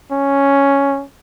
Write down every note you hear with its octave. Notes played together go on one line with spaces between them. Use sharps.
C#4